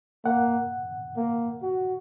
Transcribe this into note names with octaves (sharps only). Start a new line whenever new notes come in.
A#3 F#5
A#3
F#4